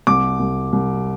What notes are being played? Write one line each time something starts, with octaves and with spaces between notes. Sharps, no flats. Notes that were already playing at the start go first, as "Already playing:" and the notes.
C2 D6
C2
C2